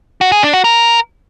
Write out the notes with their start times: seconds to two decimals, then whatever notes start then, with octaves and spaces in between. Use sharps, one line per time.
0.21 F#4
0.32 G#4
0.43 D4
0.54 F#4
0.64 A#4